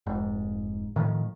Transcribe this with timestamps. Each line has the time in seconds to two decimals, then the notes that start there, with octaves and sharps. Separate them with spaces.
0.06 F1 G#2
0.96 A2 D#3 F3